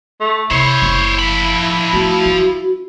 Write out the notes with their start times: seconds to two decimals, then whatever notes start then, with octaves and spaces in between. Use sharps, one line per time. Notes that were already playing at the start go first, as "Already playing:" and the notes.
0.20 A3
0.51 C3 E4 C5 C#5
0.82 F#1 F#2
1.19 F3 B5
1.93 A3 F#4
2.26 C#4